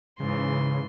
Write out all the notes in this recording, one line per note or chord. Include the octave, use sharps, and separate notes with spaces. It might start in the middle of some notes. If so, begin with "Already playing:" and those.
G#2 C#3 E3 C6